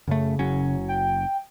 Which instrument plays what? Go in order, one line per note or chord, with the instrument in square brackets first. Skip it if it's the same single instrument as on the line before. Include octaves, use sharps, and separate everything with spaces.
[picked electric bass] F#2 A3 [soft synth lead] C#3
[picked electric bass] F#1 F#3 C#4
[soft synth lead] G5